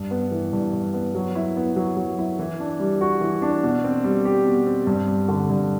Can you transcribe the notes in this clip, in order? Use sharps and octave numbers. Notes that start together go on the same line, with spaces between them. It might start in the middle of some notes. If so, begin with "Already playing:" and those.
Already playing: G2
B3
E3
G2
G2
B3
F#3
E4
B3
F#3
F#3
E4
E3
D4
G3
F#4
E3
D4
B2
C4
G3
G4
B2
C4
G2
G3
D3
G2